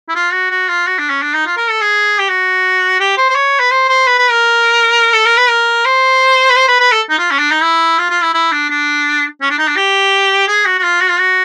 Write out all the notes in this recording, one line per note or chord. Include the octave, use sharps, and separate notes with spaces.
E4
F4
F#4
F#4
F4
F#4
D4
C#4
D4
D#4
F4
A#4
A4
G#4
G4
F#4
G4
C5
C5
C#5
B4
C5
C5
B4
B4
A#4
A4
A#4
B4
A#4
C5
B4
C5
B4
B4
A4
D#4
F4
C#4
D4
D#4
E4
F4
F4
E4
E4
D4
D4
C#4
D4
D#4
D4
G4
G#4
F#4
F#4
F4
F#4
F4
F#4